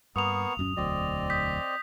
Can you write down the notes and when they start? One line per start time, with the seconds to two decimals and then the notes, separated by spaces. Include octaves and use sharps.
0.16 G2 A#3 B3 C#6 D#6 F7
0.57 D#1 F#2 C#4
0.77 E1 D2 F#3 C4 D5 D#5
1.30 D#6 G6 B6